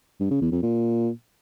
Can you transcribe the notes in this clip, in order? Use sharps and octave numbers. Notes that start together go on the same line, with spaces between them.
G2
C#3
E2
F2
A#2